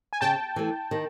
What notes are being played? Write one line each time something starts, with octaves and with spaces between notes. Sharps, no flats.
G#5
C#3 G5 A5
E3 A3
D#3